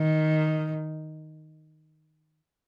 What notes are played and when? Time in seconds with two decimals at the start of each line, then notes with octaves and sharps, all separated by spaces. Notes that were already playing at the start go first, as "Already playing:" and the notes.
Already playing: D#3